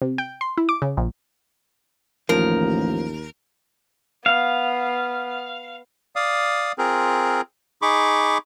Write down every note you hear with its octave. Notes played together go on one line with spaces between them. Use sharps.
C3
G5
C6
E4
D6
C#3
A#1
A1 D#2 F3 A#4
B3 F5
D5 F5 D#6
C4 F4 G#4 A#4
D#4 G#4 B5 C#6 D6